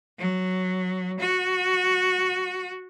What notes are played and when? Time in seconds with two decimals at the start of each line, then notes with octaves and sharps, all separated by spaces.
0.18 F#3
1.20 F#4